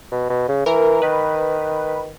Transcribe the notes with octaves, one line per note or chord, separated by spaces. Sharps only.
B2
B2
C#3
E3 A#4
D#3 B4